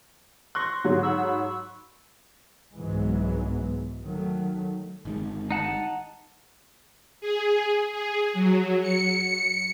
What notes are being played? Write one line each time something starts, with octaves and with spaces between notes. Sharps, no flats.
C6 C#6 F#6 A#6
G#2 D3 F#3
B5 C#6 E6
C2 G#2 E3 F#3 G#3 B3
D#3 F#3 A3
G1 D#3 G#3
D#4 F#5 A5
G#4
G#4
F#3
C#7